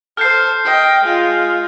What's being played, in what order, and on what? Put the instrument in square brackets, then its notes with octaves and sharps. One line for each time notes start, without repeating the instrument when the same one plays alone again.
[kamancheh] A4 C5 [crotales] F6 G6 C7
[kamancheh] D#5 G5
G#3 F4